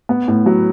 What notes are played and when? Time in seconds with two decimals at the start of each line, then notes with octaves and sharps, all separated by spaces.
0.09 B3
0.28 A2
0.46 F#3